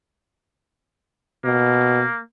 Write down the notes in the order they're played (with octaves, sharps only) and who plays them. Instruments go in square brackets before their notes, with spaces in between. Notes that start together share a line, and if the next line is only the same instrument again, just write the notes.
[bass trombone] B2 [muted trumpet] A#3